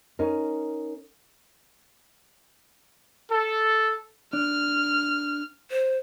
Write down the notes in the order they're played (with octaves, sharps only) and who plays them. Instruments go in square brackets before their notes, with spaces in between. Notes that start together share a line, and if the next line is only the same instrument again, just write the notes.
[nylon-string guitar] C#4 D#4 A#4
[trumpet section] A4
[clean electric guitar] D4 [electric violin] F6
[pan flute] C5